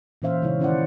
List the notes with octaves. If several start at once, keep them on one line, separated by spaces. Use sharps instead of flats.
A#2 E3 C#4 C5 E5 F5
C#3 G#3 D#4 E4 G#4 C#5
D#3 C#4 E4 C5 D5 F#5